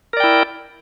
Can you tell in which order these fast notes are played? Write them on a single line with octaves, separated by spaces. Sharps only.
A#4 D5 G5 E4